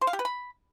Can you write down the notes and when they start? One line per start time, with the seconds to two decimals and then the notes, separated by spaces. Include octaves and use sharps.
0.01 C5
0.07 F5
0.13 G4
0.19 B4
0.25 B5